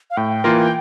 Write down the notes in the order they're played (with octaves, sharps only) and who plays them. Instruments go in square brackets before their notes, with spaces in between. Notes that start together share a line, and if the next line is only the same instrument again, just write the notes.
[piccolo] F5
[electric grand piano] A2 [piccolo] G5
[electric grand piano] E3 A#3 F4 A#4